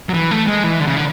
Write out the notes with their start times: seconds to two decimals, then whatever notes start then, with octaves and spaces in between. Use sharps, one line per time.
0.09 F#3
0.14 E3
0.31 A3
0.47 G#3
0.64 E3
0.80 D3
0.87 C#3
0.97 D3